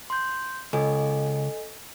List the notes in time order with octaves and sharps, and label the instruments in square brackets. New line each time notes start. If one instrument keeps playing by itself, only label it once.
[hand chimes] C6 G6
[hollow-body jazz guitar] C#2 [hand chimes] A4 D#5 G#5